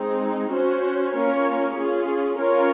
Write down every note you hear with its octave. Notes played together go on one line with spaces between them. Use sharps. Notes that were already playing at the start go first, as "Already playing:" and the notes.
Already playing: G#3 C4 D#4
C#4 F#4 C5
A#3 C#4 F4 A#4 C#5
C#4 F4 G#4
C#4 F4 A#4 C#5